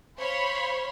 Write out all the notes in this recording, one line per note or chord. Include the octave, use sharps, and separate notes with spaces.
C5 C#5 F5 B5 C6